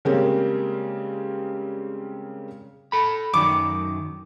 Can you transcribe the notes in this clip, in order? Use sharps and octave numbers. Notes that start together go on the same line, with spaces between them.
C#3 G3 G#3 A#3 C4 C#4
A4 B5
F#2 D#3 F#3 D6